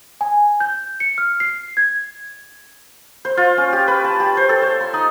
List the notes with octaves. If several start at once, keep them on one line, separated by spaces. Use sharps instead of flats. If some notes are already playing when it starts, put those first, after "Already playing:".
G#5
G6
C#7
F6
C7
G#6
C5
F4
C#4
G4
B4
A5
G4
C5
A4
C#5
C6
D#4